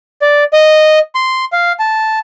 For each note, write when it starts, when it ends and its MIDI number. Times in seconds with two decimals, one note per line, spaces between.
0.22 0.44 74
0.53 0.99 75
1.15 1.45 84
1.53 1.72 77
1.79 2.19 81